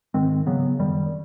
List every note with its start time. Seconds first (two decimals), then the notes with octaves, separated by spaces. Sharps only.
0.14 G#2 D#3 G#3 C4
0.47 C#3 F#3 B3
0.79 F#2 D#3 G3